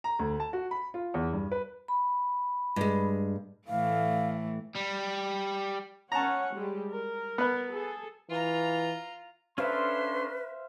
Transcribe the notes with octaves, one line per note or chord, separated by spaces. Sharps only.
A#5
D2
A5
F#4
B5
F4
E2
G2
B4
B5
G2 G#3
A2 E3 A3 F5
G3
C#4 C#5 F#5 A5 A#5
G3 G#3 G4
A#4
B3 B4
G#4 A4
E3 F4 A#5
C#4 D4 A4 B4 C5 E5 F5 C6